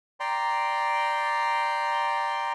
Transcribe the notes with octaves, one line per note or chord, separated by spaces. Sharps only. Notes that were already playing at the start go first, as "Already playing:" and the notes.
D5 G5 A#5 C6